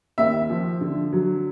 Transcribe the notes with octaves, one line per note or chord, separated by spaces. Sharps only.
D#2 E5
F3
D3
F#3